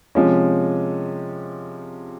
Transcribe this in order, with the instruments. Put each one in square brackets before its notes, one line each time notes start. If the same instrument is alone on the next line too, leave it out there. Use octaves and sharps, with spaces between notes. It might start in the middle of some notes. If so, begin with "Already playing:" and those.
[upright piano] C3 F3 G#3 C#4